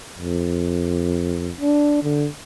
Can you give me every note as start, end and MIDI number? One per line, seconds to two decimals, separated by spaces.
0.17 1.51 41
1.60 1.99 62
2.03 2.27 50